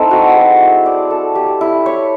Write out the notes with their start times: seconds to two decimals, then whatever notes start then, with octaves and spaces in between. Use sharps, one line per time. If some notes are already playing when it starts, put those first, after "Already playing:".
Already playing: C4 D#4 E4 A4
0.11 F#4
0.36 G#4
0.60 E4
0.86 D5
1.10 A4
1.35 G4
1.61 E4
1.86 C#5